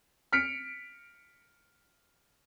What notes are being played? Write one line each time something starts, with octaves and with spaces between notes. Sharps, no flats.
F6 B6 C#7 D7